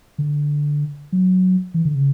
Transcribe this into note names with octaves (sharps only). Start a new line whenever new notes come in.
D3
F#3
E3
D3
C#3